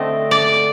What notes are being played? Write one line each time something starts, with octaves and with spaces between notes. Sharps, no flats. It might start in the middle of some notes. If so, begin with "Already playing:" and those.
Already playing: D3 A3 C4 D#5
D5